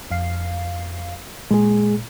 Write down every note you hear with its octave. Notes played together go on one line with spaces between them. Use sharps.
F2 F5 C7
A#2 G#3 G#4